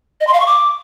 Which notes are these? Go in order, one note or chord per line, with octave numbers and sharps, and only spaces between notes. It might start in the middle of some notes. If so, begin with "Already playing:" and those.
D#5
C6
F5
C#6
D6